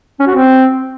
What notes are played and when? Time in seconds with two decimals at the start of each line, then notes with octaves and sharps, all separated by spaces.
0.19 C#4
0.27 F#4
0.34 C4